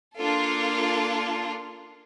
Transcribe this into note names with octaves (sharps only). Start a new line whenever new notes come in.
A#3 D4 F4 A4